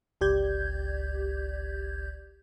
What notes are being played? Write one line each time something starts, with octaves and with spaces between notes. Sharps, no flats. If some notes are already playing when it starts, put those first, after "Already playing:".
G1 C#2 G4 D5 G6 G#6